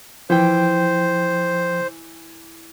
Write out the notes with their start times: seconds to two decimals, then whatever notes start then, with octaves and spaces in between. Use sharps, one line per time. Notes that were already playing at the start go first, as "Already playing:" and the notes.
0.30 E3 F3 C5 G5